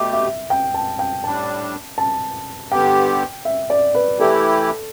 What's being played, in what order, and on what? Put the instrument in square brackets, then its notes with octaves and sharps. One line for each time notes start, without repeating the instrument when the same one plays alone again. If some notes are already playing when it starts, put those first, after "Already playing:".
Already playing: [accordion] B2 A3 G4 [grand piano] E5
[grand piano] E5
G5
A5
G5
[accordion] A2 G3 D4 [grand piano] A5
[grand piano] A5
[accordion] G2 D3 B3 G4 [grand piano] G5
[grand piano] E5
D5
B4
[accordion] E3 A3 E4 G4 [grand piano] A4